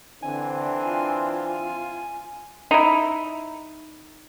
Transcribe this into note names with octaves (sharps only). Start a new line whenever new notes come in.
D3 E3 C4 D4 G#5
F4
D#4 E4